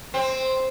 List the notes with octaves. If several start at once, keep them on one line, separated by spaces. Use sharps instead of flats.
C4